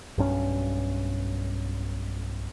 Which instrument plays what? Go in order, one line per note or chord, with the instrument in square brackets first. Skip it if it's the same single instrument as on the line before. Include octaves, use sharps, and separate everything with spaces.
[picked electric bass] B1 G2 C#4